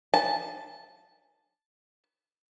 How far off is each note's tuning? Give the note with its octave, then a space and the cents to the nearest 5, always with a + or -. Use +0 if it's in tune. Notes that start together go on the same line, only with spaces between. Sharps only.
A5 -5